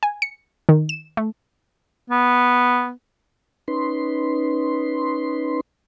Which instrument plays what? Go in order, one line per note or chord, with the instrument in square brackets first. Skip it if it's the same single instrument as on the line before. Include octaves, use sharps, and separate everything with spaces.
[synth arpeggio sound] G#5
C#7
D#3
E7
A3
[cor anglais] B3
[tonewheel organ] C#4 D#4 B4 C6